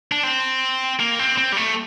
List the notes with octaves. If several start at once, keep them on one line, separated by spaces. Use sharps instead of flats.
D4
C4
A#3
C4
C4
G3
A3